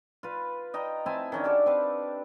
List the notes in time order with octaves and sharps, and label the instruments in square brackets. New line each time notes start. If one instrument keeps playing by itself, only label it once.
[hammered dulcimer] F4 B4
D#5 G5 A#5
C4 E4 G#5 A5
D#3 C#4 D4
F#4 G4 A4 D5
C4 B4 F5